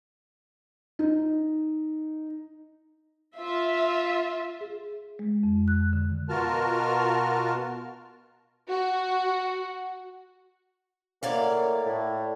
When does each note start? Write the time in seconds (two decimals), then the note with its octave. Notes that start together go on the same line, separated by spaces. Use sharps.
0.99 D#4
3.38 F4 E5
4.61 G#4
5.19 G#3
5.43 F2
5.68 F#6
5.93 D3
6.29 B2 F4 F#4 A#4 A5 F6
8.68 F#4
11.23 A2 F#3 A#3 C#5 D5 F5
11.85 A2